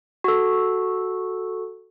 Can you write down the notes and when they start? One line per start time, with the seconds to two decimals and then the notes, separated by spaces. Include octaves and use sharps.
0.24 F#4 A4